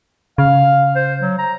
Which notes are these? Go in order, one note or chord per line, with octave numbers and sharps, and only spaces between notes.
C#3 F5
C5
F#3
A#5